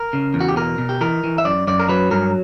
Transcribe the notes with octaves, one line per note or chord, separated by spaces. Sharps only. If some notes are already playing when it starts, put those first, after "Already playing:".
Already playing: A#4
C#3
E2
F#4
G4
B2 A#4
B2
G4
E3 A#4
E3
E5
F#2 D5
F#2 D5
A#4
F#3 B4
G2 A#4